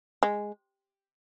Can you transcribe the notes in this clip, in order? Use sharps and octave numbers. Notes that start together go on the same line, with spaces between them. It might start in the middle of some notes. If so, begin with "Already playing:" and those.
G#3